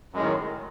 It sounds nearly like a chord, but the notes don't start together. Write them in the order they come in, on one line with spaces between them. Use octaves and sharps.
F#2 G#3 A2 D#3 F#3